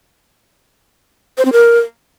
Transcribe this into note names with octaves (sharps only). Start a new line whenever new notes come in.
C5
C4
A#4